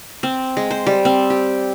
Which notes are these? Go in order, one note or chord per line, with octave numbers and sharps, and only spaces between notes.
C4
G#3
C5
G3
C4
G4